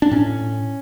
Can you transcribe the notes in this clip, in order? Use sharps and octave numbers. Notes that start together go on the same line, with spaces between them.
D4
A2 C#4